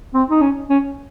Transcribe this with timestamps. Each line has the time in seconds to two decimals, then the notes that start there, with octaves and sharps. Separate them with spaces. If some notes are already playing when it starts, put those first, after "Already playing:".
0.14 C4
0.30 D#4
0.42 C#4
0.69 C#4